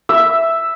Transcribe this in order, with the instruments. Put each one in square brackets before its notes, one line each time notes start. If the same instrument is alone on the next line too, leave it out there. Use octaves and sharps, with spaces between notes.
[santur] E5